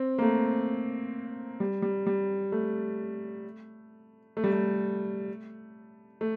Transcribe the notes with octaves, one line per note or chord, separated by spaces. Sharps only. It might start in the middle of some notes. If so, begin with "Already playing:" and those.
Already playing: C4
A#3
A3
G3
G3
G3
A3
A3
G3
A3
A3